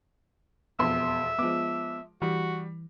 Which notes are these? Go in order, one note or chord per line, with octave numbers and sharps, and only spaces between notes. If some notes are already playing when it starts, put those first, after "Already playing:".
E1 F2 B3 E5 C6
F3 G#3 B3 D6
E3 G3 F#4